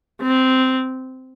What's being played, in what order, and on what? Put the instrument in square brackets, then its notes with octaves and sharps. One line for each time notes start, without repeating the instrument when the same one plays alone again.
[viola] C4